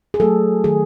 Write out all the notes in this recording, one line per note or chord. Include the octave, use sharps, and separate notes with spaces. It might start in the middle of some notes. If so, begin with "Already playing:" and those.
G#4
F#3 A3 A4
D#3 G#4